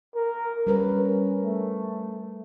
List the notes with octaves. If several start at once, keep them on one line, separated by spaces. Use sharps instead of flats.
A#4
G3 C#4 A#4 B4
A3